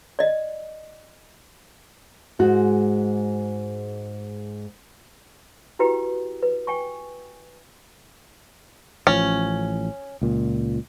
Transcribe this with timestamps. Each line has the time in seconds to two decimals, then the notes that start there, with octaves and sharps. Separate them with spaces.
0.19 D5 D#5
2.39 G#2 G#3 F#4
5.79 E4 F#4 G4 B4 G5
6.42 B4
6.67 G5 G#5 C#6
9.07 A1 F3 C#4
10.22 C#2 A#2